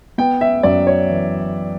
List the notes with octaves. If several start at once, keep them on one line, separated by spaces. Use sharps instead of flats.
B3 G5
E5
F#2 D5
C#5
E3